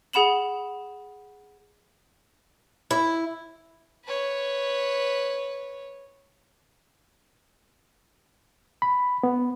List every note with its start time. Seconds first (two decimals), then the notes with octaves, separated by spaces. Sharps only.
0.13 G#4 F#5 B5 E7 F#7
2.91 E4
4.05 B4 C#5
8.82 B5
9.23 B3